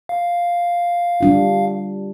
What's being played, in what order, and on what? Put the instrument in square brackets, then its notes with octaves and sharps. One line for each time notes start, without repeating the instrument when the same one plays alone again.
[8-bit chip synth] F5
[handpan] G3 D4 F4